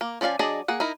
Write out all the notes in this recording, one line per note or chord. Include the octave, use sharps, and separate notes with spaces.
A#3
F3 C#4 D5 F5 G#5
F#3 D4 G#4 D5 D#5
A#3 G#4 F#5
D#4 E4 A#4